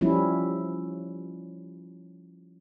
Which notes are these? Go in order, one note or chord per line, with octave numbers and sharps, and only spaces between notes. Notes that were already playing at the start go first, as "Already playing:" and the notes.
F3 G3 C#4 E4